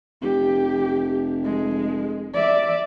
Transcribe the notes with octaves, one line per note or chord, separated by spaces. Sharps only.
F1 G4
G#3
D5 E5